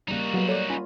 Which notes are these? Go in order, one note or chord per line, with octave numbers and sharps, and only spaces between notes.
E2 C#3 G3 A#3 D#4 F#4
A#2 F#3 G#3 B3
A3 C#5 D5
C#4 F4 B5 D#7